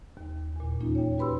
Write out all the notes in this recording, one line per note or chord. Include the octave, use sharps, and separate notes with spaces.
D#2
E2 A#2
E3 A#3 C#4 D#4 F4
C#5 G5
F#4 G4 B4 B5 C6 E6